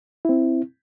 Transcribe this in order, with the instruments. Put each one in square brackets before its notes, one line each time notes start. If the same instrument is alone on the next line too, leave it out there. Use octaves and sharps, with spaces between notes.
[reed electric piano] C4 E4